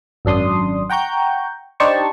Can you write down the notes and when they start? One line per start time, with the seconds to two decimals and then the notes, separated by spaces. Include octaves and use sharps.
0.25 G#1 F#2 D4 C6 D#6
0.90 F#5 G5 A#5 C#6 G6
1.80 D4 D#4 G4 C5 A5 C#6